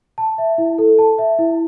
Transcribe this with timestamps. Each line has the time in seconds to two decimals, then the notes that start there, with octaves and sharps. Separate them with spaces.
0.18 A5
0.38 E5
0.58 E4
0.78 A4
0.98 A5
1.18 E5
1.39 E4